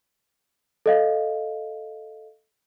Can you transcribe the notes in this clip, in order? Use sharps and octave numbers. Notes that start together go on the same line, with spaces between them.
A4 D#5 F5